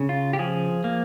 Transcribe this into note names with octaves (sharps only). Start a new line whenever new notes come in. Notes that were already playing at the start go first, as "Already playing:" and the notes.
Already playing: C#3
F4
G4
F3 G#4
A#3